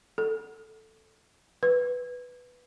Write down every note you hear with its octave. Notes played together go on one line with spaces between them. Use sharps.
A4
B4